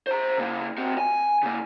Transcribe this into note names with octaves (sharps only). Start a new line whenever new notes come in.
C5 A#5
C#3 A#3
C4 F#4
G#5
C#3 A#3